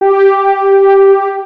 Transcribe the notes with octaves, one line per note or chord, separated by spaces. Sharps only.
G4